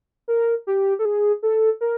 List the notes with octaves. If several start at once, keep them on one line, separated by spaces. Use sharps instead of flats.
A#4
G4
A4
G#4
A4
A#4